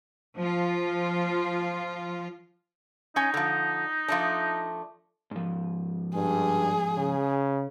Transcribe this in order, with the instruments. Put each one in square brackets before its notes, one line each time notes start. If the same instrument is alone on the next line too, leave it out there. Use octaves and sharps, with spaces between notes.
[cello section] F3 F4
[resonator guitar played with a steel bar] C#4 G#5 [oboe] D#4
[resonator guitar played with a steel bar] D3 F3
F3 A3 D4
[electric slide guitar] G#2 F3
[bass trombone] G2 [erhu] G#4
[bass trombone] C#3